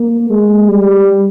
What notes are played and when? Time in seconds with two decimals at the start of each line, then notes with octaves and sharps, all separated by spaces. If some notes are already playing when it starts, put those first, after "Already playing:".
Already playing: A#3
0.30 G#3
0.69 G3